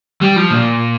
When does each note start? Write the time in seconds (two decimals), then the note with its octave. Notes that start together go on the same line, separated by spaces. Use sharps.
0.21 G3
0.36 F3
0.51 A#2